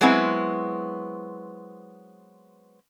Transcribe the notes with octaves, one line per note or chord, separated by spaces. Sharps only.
F#3 G#3 B3 C4 E4